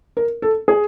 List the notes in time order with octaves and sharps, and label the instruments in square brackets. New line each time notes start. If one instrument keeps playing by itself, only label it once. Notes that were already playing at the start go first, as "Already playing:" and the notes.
[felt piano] A#4
A4
G#4